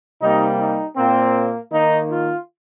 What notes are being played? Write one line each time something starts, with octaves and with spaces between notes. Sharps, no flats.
C3 G3 A#3 D#4
D#4
A#2 A#3 C4
D#3 A#3 D#4
F4